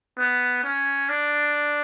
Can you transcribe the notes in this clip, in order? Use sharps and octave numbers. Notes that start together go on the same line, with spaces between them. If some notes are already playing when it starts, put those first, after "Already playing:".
B3
C#4
D4